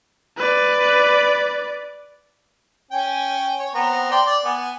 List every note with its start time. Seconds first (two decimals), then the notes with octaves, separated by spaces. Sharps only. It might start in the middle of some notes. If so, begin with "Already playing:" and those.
0.37 B4 D5
2.91 C#4 G5 G#5
3.59 C#5
3.74 B3 C4 A#5
4.11 D5 G5 C6
4.25 D5
4.45 B3 G#5